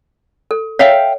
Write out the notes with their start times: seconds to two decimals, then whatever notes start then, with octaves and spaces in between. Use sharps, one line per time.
0.51 A4
0.79 C#5 E5 F5 G5